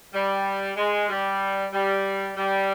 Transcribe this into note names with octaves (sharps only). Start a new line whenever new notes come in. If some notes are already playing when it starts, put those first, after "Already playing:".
G3
G#3
G3
G3
G3